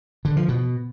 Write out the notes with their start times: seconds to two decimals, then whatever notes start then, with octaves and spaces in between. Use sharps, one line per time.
0.25 D3
0.37 F3
0.48 B2